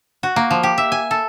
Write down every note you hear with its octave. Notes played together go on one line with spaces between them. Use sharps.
F#4
A#3
F3
G4
E5
G#5
A4